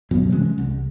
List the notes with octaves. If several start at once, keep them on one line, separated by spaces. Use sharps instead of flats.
C#2 G2 B2 F#3
C3 E3 G#3 C#4
C2